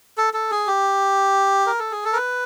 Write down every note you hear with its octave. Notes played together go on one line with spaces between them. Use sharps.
A4
A4
G#4
G4
A#4
A4
G#4
A4
A#4
B4